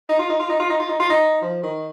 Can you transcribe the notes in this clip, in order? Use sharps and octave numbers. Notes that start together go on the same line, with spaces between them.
D#4
F4
D#4
F4
D#4
F4
D#4
F4
D#4
F4
D#4
F3
D#3